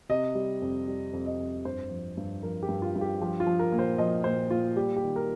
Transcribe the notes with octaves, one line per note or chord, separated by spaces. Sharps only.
C3 D#5
G3
F2
G3
F2
D#5
F2
G2 C5
F3
G2
F3 A#4
G4
G2
F4
G2
G4
F3 G4
F4
F3
A#4
A#2
C5
F3 D#5
A#2 C5
A#2 F4
G3 G4
G4
D#3
A#4